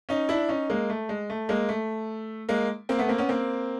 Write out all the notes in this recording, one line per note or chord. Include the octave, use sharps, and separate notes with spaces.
C#4 D#4
D4 E4
C#4 D#4
G#3 A#3
A3
G#3
A3
G#3 A#3
A3
G#3 A#3
A#3 C4
A3 B3
A#3 C4
B3 C#4
A#3 C4